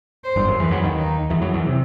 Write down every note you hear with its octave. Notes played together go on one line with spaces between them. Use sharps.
C5
G1 G2
F#2
E2 E3 B4
F#2 F#3
D#2 D#3
D#4
E2 E3
F#2 F#3
E2 E3
C3